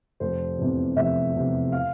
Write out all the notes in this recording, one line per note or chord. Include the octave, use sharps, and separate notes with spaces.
F1 C5
E2 C3
F1 E5
E2 C3
F5